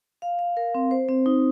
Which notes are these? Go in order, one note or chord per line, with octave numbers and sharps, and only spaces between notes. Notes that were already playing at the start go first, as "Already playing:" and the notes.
F5
F5
A#4
C4
C5
C4
D#4